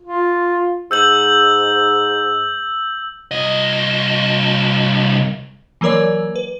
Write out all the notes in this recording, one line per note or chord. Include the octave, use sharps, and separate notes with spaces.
F4
G#2 E6 G6 F#7
C2 D#5
E3 F#3 A#3 A#4 C#5 D5
B4